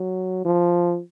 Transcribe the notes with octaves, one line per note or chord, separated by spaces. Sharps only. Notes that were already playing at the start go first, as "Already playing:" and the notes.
Already playing: F#3
F3